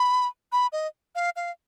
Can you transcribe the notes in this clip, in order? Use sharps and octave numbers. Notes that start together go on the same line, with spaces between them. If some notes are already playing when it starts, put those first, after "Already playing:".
Already playing: B5
B5
D#5
F5
F5